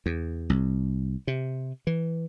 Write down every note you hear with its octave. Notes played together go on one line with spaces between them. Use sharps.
E2
C2
C3
E3